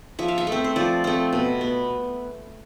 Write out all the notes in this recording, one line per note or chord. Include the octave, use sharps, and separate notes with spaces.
F3 E5
F5
E5
A3
C4
C5
F3 D5
A3 C4
B2
B3